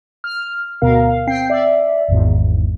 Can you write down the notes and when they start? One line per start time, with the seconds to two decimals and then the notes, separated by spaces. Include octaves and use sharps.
0.24 F6
0.82 D2 B2 B3 A#4 F5
1.08 F5
1.27 C4 G5 C7
1.50 D5 E5
2.08 G#1 E2 G#2